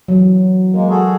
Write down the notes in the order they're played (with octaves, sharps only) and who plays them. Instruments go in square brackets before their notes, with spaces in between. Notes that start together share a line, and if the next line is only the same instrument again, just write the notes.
[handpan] E3 F#3
[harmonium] G#3 A#3 [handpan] A#4
[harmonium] F#4 G#4 A4